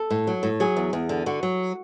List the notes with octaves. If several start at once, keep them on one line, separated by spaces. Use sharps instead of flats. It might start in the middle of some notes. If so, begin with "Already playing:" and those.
Already playing: A4
A2
F#3
A2
F#3 G#4
E2
E2
D3
D3 F#4
F#3